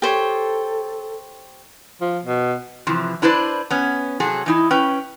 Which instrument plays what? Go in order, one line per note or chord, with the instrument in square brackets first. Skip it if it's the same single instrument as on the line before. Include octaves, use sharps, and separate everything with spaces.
[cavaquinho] G4 C5 C#5 [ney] A4
[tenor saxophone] F3
B2
[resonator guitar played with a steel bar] C3 E3 F3
D4 E4 B4 C5 D5
B3 C#4
C3 F#3 G#4 A4
E3 D#4 E4
C#4 B4 G5